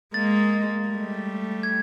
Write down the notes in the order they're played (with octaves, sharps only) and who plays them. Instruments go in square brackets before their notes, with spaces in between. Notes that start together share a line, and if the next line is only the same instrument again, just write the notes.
[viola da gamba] G#3 A#3 [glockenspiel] A6
[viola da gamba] G3 A3
[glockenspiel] G#6